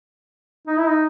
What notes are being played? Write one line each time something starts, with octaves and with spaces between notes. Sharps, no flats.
D#4
E4
D#4